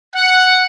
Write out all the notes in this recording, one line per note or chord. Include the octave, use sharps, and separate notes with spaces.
F#5